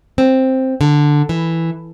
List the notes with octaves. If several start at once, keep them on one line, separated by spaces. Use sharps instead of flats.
C4
D3
E3